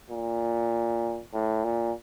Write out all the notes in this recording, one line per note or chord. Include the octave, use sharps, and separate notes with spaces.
A#2
A2
A#2